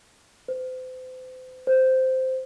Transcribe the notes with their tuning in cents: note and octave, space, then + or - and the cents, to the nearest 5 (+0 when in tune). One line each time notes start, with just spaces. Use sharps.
C5 -35
C5 -5